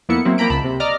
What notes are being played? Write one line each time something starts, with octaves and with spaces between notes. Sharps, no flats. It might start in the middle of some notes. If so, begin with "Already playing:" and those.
F2 A#3 B3 E4 C#7
F#3 A#3 C4 E4
F3 A#3 G5 A#5 B5 D7
C#2 A5 B5
C3
D5 D#5 A#5 D6 F6